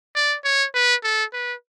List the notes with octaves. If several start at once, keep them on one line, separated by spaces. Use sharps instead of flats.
D5
C#5
B4
A4
B4